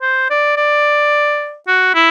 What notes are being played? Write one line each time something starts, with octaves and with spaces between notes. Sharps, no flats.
C5
D5
D5
F#4
E4